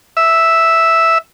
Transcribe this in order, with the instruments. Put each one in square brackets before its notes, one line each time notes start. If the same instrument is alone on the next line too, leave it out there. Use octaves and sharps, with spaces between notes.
[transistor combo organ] E5